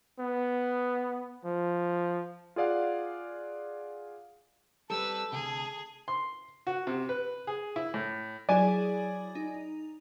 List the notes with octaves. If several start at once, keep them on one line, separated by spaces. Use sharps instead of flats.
B3
F3
F4 G#4 D5 F5 F#5
G3 C4 A4 B4 A5 E6
D2 C3 G#4
C6
F#4
C3
B4
G#4
E4
A2
F#3 E4 G#4 D5 G#5
D#4